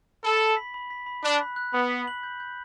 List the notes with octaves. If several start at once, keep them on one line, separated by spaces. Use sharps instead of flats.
A4 B5
F#7
B6
B5
B6
B5
D4 F#6
B5
F#6
B3 B5
B6
F#7
G6
G6